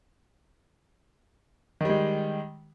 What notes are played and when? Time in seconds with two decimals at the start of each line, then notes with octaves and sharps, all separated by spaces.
1.81 D#3
1.85 G3
1.89 G#3